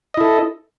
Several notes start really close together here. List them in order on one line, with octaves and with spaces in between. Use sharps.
D#5 E4 A4